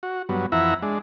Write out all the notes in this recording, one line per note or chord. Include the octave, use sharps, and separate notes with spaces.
F#4
G2 F#3 B3
F2 E3 E4 E5 F#5 A#5
G#3 D4